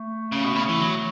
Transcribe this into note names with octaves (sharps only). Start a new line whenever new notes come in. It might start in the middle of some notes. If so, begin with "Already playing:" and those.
Already playing: A3
C#3
B2
C#3
E3
F#3